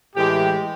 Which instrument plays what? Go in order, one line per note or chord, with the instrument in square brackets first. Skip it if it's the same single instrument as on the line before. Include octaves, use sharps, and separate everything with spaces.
[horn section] A2 E3 G#3 G4